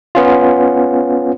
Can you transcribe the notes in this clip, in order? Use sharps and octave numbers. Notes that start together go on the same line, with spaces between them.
B3 C#4 F4